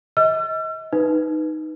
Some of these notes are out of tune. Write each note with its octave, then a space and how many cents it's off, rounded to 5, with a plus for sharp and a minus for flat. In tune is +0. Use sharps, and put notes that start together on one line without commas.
D#5 +40 E6 +45
D#4 +0 B4 +0